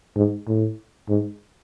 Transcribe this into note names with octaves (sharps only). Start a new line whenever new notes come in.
G#2
A2
G#2